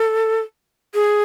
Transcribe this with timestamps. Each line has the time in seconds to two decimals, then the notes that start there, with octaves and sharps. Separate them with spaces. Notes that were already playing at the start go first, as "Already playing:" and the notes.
Already playing: A4
0.94 G#4